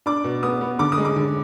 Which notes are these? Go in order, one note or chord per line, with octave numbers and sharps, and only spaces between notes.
D4 D6
B2
B3 D#6
B3
D3 D6
D#6
G#3
D6
D3